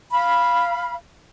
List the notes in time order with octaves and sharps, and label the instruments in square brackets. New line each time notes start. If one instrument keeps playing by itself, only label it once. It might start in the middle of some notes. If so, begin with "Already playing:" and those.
[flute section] F5 B5